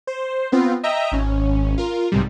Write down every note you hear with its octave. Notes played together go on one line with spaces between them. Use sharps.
C5
B3 C4 F4
D#5 E5 G5 A#5
G#1 C#4
F4 A#4
B1 G#2 C3 G3